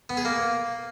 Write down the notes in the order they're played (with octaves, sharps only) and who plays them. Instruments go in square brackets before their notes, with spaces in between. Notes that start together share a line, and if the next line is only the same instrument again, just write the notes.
[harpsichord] B3
G#4
A#3